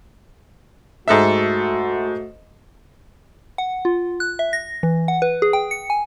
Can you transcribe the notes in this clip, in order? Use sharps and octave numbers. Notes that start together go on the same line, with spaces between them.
G#2 A3 F#4 A4 E5
F#5
F4
F#6
E5
A#6
E3
F#5
B4
G#4
G5
C#7
G#5